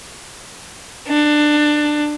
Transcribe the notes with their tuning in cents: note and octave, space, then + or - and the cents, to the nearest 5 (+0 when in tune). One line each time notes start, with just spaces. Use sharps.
D4 +20